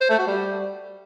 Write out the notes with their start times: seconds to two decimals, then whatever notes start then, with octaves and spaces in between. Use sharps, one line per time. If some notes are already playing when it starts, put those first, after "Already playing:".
0.01 C5
0.10 A3
0.18 F#4
0.27 G3